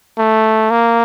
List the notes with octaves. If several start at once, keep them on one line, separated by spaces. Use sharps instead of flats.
A3
A#3